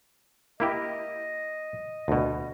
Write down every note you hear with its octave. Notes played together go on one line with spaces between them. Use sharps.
A#3 E4 G4 D#5
D2 B2